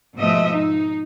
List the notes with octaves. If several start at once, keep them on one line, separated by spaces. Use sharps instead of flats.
G#2 B2 F3 A3 D#5 E5
D#4